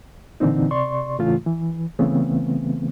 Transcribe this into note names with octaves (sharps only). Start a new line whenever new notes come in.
A#2 D3 E3 C4 D#4
C3 D5 C6 C#6
A2 C#3 E3 A3 F4
E3
C#3 E3 A3 B3 C4